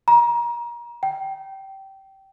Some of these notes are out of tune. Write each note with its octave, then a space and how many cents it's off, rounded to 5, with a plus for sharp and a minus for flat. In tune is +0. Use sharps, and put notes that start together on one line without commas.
A#5 +30
G5 -20